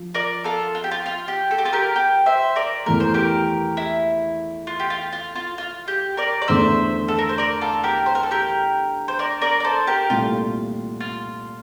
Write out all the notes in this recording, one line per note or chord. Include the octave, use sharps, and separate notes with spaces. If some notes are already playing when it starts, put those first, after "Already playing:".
Already playing: F3
A#4 D5
F4 A4
F4
G4
F4
F4
G4
A4
G4
F4 A4
G4 A#4
G4
C5 E5
A#4 D5
E2 E3 A3 A#4
C5
G4 A#4
E4
F4
G4
F4
F4
F4
F4
G4
A#4 D5
D5
E2 D3 A3 C5 E5
A4
A#4
C5
A#4 D5
F4 A4
G4 A#4
C5
A#4
A4
G4 A#4
C5
A#4 D5
A#4 D5
D5
A4 C5
G4 A#4
C2 A#2 A3 F4
F4